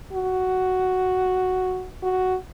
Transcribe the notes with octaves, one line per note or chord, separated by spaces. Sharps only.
F#4
F#4